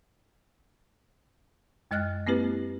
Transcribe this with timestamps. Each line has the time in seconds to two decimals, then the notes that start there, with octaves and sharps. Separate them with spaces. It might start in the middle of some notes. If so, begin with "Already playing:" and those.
1.91 F#2 G#3 D#5 F6 F#6 A6
2.27 A#3 C4 E4 G4 B4